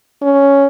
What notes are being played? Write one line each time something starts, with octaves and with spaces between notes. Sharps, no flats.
C#4